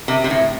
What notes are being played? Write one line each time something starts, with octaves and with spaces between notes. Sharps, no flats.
C3
C3
A2